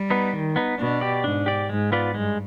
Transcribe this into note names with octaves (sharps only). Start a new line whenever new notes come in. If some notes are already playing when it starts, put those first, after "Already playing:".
Already playing: G3
B3 D#4 B4
D#3
B3 D#4 B4
B2 D4
G4 D5
G#2 D4
G4 D5
G#2 G#3
B3 F4 B4 D5
G2 G#3